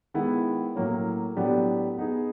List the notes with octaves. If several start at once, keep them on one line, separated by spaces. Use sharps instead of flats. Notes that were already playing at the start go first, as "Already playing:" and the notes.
D#3 G#3 B3 E4
A2 F#3 A#3 C#4
A2 F#3 B3 D4 G4
B3 D#4 G#4